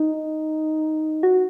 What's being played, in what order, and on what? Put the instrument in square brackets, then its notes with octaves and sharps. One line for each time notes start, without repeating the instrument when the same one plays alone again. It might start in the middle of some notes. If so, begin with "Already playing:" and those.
Already playing: [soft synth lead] D#4
F#4